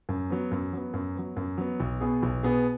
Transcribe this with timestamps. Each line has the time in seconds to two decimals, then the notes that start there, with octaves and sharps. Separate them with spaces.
0.09 F#2
0.30 F#3 B3
0.51 F#2
0.73 F#3 B3
0.94 F#2
1.16 F#3 B3
1.36 F#2
1.58 F#3 B3
1.80 B1
2.01 B2 B3 G#4
2.22 B1
2.43 B2 B3 G#4